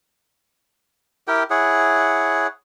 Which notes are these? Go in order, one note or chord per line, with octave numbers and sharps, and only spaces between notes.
E4 G4 A#4 G5
E4 G#4 C#5 F#5